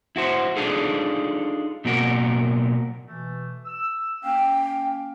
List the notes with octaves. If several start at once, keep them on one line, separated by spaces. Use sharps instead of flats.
E4 F#4 C5
D4 D#4 F4 G#4 A4
B2 F#3 A#3 F#4 A#4 F#5
B2 E3 A3
E6
A#3 C#4 F5 G5